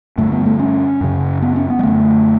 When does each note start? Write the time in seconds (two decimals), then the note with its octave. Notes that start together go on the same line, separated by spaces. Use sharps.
0.18 G2 D3 A3
0.32 B3
0.46 A3
0.59 C#4
1.01 F#2 C#3
1.42 B3
1.56 C#4
1.70 B3
1.79 G3
1.83 F#2 D3 A3